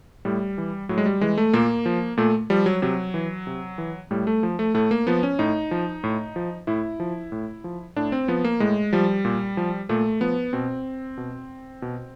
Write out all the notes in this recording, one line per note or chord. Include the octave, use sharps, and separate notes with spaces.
A2 G3
E3
A2 F#3
G#3
G3
E3 G#3
A3
A#2 A#3
F3
A#2 A3
F3 G3
F#3
C3 F#3
E3
C3
E3
A2 G3
A3
F3
A3
A2 A3
A#3
F3 B3
C#4
A2 D#4
F3
A2
F3
A2 E4
F3
A2
F3
A2 D4
C4
F3 B3
A#3
A2 G#3
F3 G3
A#2
F3
A#2 A3
F3 B3
B2 C4
B2
B2